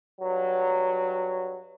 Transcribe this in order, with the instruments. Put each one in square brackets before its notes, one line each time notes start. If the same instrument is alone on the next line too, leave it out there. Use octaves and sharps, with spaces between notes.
[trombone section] G2 F#3